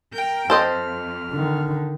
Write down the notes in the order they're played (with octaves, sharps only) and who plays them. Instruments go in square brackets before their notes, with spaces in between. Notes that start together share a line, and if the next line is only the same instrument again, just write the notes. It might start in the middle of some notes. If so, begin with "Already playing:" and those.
[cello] A#4 G5
[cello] F2 [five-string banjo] A4 C5 D#5 [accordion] F6
[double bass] D3 D#3